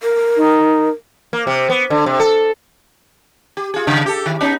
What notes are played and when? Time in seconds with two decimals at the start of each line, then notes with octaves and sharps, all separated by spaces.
0.03 A#4
0.37 D#4
1.33 A#3
1.47 C3
1.70 B3
1.90 D3
2.06 C3
2.20 A4
3.57 G4
3.74 F4 G#4
3.87 G2 C#3
4.06 G4 A4
4.26 D#3
4.40 B3 C#4 D#4